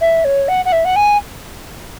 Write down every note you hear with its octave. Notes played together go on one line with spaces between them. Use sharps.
E5
C#5
F#5
F#5
E5
F#5
G#5